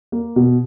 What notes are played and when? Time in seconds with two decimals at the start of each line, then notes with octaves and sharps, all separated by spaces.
0.12 A#3
0.36 B2